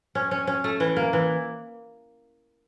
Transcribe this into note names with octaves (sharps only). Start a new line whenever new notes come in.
C#4
C#4
C#4
A3
E3
A#3
E3